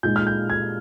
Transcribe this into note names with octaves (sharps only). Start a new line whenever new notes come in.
A#2 G#3 D#4 G6
F6
G6
G#6